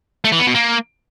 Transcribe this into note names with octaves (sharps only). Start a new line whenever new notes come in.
A3
E3
B3
B2
A#3